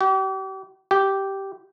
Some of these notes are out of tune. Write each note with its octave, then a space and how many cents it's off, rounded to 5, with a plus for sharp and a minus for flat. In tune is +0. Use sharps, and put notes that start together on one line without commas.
G4 -40
G4 -10